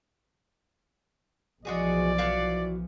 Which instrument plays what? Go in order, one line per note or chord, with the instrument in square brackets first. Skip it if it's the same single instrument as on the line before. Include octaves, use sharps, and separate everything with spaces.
[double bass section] B1 E3 F3 [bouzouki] G#3 F#4 G#4 [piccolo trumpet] D5
[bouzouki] E4 F#4 F5